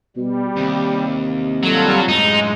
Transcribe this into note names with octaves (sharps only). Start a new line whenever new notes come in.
B2 G3
D#2 C3
F#3 G3 F4 A4
F#2 A2 G#3 D#4